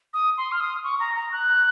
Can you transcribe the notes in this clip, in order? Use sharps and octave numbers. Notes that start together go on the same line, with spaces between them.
D#6
C6
F6
D#6
C#6
A#5
A#5
F#6